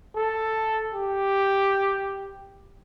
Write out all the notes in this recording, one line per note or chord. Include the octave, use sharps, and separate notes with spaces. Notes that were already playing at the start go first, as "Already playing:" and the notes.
A4
G4